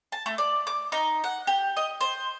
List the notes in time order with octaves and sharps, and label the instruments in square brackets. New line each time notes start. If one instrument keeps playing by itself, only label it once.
[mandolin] A5
A3
D5
D6
D#4
F#5
G4
D#5
C5